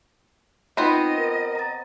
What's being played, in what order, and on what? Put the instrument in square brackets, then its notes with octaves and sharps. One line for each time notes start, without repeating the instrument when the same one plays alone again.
[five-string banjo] B3 C4 [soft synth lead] D#4 [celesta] F4 [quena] D#5
[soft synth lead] A#4
[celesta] A#5 A6